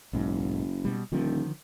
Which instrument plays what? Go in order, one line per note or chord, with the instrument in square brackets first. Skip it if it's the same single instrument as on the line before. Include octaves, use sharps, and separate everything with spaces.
[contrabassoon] F#1 [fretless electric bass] B1 G#2
[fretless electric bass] B2 G3
[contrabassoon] D#1 [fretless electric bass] D3 D#3 F3